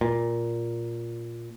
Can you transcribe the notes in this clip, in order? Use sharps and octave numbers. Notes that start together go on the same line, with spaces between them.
A#2